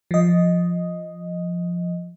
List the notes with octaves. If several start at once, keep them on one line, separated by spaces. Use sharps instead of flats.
F3 D#5